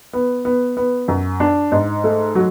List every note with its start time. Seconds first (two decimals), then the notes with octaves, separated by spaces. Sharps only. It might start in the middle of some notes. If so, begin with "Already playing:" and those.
0.13 B3
0.45 B3
0.77 B3
1.08 F#2
1.40 D4
1.72 G#2
2.04 A3
2.35 F#3